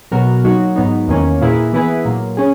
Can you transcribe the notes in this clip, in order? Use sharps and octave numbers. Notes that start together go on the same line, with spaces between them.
B2 F#3 B3 F#4 A#4
F#3 A#3 D#4 F#4
G#2 F#3 B3 D#4
E2 D#3 A#3 C#4
A#2 A#3 E4 G#4 B4
E3 B3 E4 G#4 B4
A#2 F#3 A#3
C#4 G#4